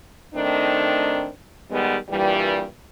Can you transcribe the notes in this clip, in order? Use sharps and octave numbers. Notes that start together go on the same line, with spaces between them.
D#3 A3 C4 D4 D#4
D#3 G3 G#3 B3
G2 A#2 E3 G3